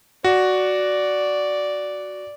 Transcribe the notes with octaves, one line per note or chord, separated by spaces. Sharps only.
F#4 D5